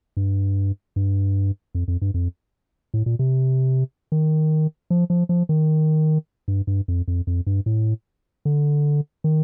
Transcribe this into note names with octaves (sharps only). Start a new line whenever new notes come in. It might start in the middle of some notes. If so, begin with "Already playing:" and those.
G2
G2
F2
F2
G2
F2
A2
A#2
C3
D#3
F3
F3
F3
D#3
G2
G2
F2
F2
F2
G2
A2
D3
D#3